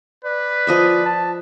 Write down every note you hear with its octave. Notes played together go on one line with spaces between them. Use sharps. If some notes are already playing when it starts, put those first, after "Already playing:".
B4 D5
F3 D#5 E5
A5